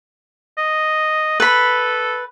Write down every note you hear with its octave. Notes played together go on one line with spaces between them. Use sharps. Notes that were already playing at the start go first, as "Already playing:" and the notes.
D#5
A4 B4 B5